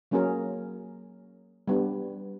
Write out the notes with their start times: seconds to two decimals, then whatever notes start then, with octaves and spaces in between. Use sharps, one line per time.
0.11 F#3 A#3 C#4 F#4 G#4 A#4
1.68 G3 B3 D4